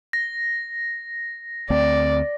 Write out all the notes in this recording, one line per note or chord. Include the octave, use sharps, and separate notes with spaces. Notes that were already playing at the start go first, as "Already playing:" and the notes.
A#6
D2 A3 C4 D5